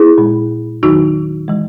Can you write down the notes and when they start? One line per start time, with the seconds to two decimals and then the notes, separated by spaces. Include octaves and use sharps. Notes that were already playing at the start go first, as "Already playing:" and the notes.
Already playing: E4 G#4
0.18 A#2 G#3
0.83 E2 D#3 F#3 D#4 F#4
1.48 E3 G#3